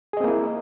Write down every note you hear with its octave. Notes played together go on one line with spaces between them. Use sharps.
A#3 C4 E4 G#4 D#5